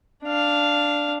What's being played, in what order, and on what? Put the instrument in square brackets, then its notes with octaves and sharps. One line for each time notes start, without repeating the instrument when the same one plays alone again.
[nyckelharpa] D4 F5